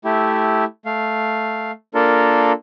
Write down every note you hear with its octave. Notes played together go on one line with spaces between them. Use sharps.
A3 E4 G4
A3 F5
A#3 D4 F4 A4 A#4